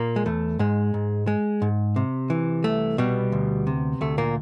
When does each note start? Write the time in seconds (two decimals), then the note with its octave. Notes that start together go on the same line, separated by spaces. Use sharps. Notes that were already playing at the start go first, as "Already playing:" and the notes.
Already playing: A#2 A#3
0.16 G#3
0.26 E2 A3
0.59 G#2 G#3
0.94 G#2
1.27 G#3
1.62 G#2
1.96 C3
2.30 E3
2.64 C2 A3
2.98 B2 G3 B3
3.32 D2
3.67 C3
4.01 D2 A3
4.18 A#2 A#3